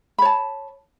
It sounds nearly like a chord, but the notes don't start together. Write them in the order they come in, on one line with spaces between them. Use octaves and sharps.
B5 C#5 A5